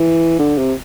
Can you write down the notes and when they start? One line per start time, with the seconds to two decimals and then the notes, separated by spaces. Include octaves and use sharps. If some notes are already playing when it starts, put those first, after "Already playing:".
Already playing: E3
0.39 D3
0.58 C3